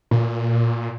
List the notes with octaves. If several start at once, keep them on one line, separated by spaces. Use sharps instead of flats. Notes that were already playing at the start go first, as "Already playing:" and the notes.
A#2